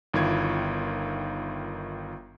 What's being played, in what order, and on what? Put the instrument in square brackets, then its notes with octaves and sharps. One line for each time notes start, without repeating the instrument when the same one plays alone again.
[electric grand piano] G1 D#3 E4 F4 C#6 G#6